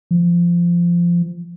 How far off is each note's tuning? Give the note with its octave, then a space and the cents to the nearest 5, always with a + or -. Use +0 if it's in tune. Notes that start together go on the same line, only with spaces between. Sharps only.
F3 -15